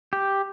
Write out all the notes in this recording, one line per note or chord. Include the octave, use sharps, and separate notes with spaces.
G4